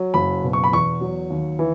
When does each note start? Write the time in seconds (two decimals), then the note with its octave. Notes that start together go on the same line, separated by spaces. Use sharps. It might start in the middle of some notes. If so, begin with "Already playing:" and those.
Already playing: F#3
0.14 F#1 B5
0.43 B2
0.53 C#6
0.64 B5
0.72 E2 C#6
1.01 F#3
1.30 D#2
1.59 E3